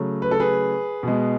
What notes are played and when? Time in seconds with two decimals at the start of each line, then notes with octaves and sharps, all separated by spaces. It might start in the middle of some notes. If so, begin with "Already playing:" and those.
Already playing: C#3 F#3 A3
0.22 B4
0.31 A4
0.40 G#4 B4
1.03 B2 G#3